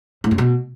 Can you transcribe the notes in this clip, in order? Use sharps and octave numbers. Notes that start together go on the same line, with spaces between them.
A2
F#2
B2